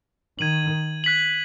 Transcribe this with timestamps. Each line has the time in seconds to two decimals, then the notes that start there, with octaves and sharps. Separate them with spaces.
0.39 D#3 G#6 D#7 F#7
1.04 F#6 B6 F#7